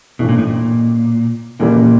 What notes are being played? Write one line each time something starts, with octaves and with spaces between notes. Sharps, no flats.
A1 G2 B2 E3 A3 C#4
A#2
A2
A#2
F1 D#2 A#2 C#3 E3 G3